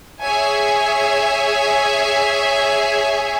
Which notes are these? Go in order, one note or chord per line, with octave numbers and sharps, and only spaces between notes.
G#4 C#5 E5 G#5